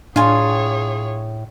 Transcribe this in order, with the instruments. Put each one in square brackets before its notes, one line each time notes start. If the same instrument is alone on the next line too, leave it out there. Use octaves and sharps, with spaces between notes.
[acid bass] A2 [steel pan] D4 [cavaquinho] F4 G#5 [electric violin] G#4 C#5